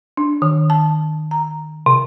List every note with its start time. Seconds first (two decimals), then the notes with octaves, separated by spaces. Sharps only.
0.17 D4
0.42 D#3
0.70 A5
1.31 A#5
1.86 C3